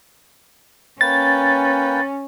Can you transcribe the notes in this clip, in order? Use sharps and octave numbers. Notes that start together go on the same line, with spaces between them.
A#3 C#4 B4 G5 A6